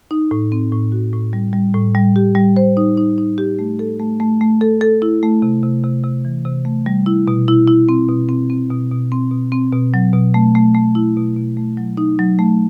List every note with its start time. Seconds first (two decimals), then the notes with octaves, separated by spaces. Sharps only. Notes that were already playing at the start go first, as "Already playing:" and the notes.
0.11 D#4
0.31 A2
0.52 C4
0.72 A2
0.92 F#4
1.13 A2
1.33 G3
1.53 G3
1.74 A2
1.95 G3
2.16 G4
2.35 G3
2.56 C5
2.77 D#4
2.97 D#4
3.18 D#4
3.38 G4
3.59 A3
3.79 A4
3.99 A3
4.20 A3
4.41 A3
4.61 A4
4.81 A4
5.02 E4
5.23 A3
5.42 C3
5.63 C3
5.83 C3
6.04 C3
6.25 E3
6.45 C3
6.65 A3
6.86 G3
7.06 E4
7.28 B2
7.48 E4
7.67 E4
7.89 C4
8.08 B2
8.29 C4
8.50 C4
8.70 B2
8.91 B2
9.12 C4
9.31 B2
9.52 C4
9.72 B2
9.94 F#3
10.13 B2
10.34 A3
10.55 A3
10.75 A3
10.95 E4
11.17 B2
11.37 B2
11.57 A3
11.77 F#3
11.97 D#4
12.19 F#3
12.39 A3